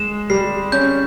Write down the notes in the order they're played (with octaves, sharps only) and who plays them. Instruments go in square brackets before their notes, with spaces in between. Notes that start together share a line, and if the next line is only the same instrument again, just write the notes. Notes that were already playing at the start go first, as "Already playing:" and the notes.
Already playing: [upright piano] G#3 [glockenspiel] E7
[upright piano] G3 [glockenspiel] C7
[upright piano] C#4 [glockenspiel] G6